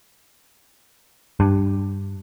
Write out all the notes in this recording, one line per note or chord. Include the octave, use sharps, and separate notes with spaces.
G2